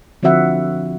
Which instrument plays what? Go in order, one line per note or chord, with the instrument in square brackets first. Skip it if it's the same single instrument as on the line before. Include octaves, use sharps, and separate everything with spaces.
[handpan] D3 F3 C4 F#4 E5 F#5